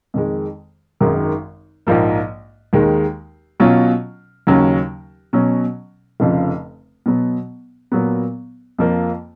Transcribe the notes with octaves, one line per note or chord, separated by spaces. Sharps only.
F2 D#3 G#3
G#1 F#2 D#3 G#3
A#1 G#2 F3 A#3
D#2 D#3 G#3
B2 F#3 C#4 F4
D#2 C#3 F#3 C#4
B2 F#3 C#4
F1 F2 C#3 F3
B2 F#3 B3
A#2 F#3 B3
F2 F3 A#3 F4